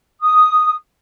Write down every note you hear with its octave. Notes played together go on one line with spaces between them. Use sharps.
D#6